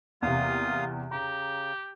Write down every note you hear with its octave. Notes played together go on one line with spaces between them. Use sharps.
E2 C3 A#3 F4 F5 D#6
C#3 G4 A#5